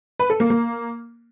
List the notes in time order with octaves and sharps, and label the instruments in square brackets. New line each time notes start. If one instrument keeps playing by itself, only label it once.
[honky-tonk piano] B4
A4
A#3
A#3